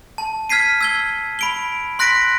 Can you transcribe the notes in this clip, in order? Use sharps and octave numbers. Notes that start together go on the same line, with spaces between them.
A5
F6 G#6 B6 C7 D#7
E6 G#6 G7
B5 D7 G7
C6 F#6 A#6 B6 D7